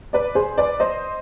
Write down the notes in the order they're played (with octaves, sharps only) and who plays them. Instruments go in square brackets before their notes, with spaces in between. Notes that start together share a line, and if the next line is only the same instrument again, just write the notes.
[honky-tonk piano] B4 D5
G#4 C5
B4 D5
C5 D#5